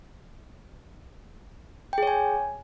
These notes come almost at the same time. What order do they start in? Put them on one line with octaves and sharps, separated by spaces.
G5 G#4 C#5 G#5